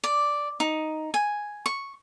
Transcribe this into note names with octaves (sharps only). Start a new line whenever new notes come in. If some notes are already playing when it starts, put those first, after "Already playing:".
D5
D#4
G#5
C#6